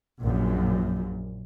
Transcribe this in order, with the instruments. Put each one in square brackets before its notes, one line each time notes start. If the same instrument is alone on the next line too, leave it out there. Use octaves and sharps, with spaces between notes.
[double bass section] A#1 F#2 A#2